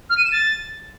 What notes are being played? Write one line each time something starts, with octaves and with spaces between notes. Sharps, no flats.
F6
D#7
E7
A6